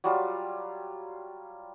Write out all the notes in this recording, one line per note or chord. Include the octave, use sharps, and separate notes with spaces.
F#3 G3 F4